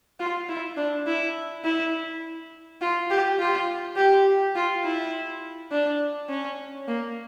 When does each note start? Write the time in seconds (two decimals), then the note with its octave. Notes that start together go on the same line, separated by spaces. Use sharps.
0.20 F4
0.49 E4
0.77 D4
1.07 E4
1.64 E4
2.81 F4
3.10 G4
3.39 F4
3.96 G4
4.56 F4
4.84 E4
5.71 D4
6.29 C#4
6.88 A#3